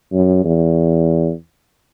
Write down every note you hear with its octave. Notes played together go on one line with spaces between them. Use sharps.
F#2
E2